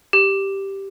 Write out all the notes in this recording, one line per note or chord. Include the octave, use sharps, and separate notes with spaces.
G4